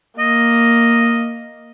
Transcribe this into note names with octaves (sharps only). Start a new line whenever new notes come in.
A#3 D#5